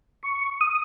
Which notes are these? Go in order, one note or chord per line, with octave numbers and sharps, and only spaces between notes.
C#6
D#6